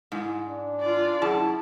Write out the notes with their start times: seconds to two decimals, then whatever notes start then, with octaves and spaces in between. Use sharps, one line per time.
0.12 G#2 G#3 E4
0.47 D4
0.80 F4 D5
1.22 F#2 E4 G#4 A5